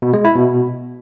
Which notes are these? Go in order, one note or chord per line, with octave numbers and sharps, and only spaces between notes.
B2
G#3
E4
B2